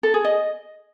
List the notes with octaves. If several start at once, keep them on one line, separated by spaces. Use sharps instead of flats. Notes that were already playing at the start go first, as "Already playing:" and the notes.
A4
G#4
D#5